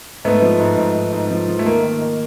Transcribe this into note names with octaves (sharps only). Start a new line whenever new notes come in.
G#2 A3 B3
F3
G#2
G#2
G#2
G#2
F3
F3
A3
D#3 A#3
D#3
D#3